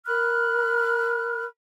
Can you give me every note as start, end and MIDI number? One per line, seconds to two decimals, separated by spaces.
0.06 1.44 70
0.06 1.44 83
0.06 1.44 89
0.06 1.44 90